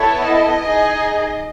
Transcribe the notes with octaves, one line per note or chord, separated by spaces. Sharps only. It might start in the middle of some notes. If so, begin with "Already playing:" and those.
Already playing: B3 E4 A4 C#5
D#5
D#4 G#4